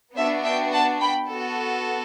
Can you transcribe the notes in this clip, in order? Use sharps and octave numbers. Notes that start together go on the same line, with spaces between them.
B3 D4 F#4 C5 E5
E5 G5
F#5 A5
G5 B5
B3 F#4 A4